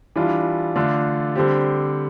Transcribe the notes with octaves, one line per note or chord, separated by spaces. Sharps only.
E3 G3 D4 F4
D3 A3 D4 F4
D3 G3 C4 G4